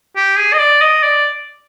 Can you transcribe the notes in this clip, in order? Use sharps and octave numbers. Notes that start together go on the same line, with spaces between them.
G4
G#4
D#5
D5
D#5
D5